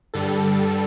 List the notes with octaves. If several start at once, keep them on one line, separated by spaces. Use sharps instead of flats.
G2 D3 G3 A4